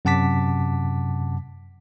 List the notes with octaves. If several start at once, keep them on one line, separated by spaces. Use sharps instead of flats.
F#2 C3 F#5 A5 D6 B6